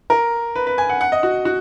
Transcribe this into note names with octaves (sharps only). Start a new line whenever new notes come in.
A#4
B4
B4
G#5
F#5
F#5
D#5
F#4
F#4